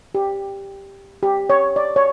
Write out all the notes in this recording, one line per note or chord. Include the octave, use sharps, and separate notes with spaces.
G4
G4
C#5
D5
C#5